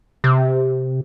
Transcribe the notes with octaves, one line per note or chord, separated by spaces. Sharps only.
C3